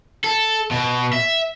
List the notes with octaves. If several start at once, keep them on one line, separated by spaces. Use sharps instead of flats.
A4
B2
E5